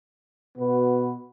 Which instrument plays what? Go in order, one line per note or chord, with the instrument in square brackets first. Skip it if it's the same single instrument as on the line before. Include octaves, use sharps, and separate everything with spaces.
[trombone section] B2 B3 F#4 B4